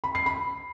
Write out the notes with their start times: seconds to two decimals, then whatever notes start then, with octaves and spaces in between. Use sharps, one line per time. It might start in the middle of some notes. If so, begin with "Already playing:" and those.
0.04 B5
0.15 C7
0.26 B5